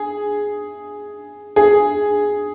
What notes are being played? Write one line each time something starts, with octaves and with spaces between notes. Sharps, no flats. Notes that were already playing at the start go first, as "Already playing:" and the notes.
Already playing: G#4
G#4